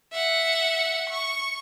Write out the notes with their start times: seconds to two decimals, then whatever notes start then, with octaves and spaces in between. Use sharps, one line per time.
0.12 E5 F#5
1.09 C#6